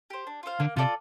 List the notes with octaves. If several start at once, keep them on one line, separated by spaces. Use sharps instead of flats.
G4 C5
D4
F4 C5 F5
D3 A#3
C3 F4 A4 D5